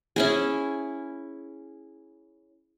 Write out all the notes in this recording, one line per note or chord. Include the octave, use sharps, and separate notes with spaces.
C#4 E4 G#4